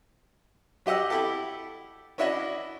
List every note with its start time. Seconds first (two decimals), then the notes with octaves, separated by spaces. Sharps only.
0.86 F#3 G4 D#5 F#5 E6
1.10 E4 G4 A4
2.18 C#4 D4 E4 F#4 D#5